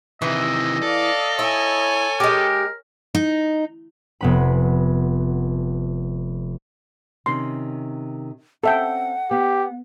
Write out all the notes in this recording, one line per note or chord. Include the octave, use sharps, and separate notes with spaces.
C3 D#3 E3 D#5
A4 D5 F5
E4 C#5 G#5
G#3 G4 A#4
D#4
F1 B3 B5
C3 D#3 C#4 C6
C4 C#4 A4 E5 F#5 G5
B3 G4